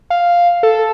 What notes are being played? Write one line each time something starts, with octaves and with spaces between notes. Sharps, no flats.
F5
A4